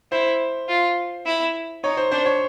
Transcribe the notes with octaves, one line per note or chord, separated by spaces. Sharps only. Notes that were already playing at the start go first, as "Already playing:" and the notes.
E4 C5
F4
E4
D#4 C#5
C5
D4 C5
C#5